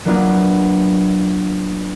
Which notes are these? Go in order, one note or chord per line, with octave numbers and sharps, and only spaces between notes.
F#3 A#3 B3 D4 E4 F4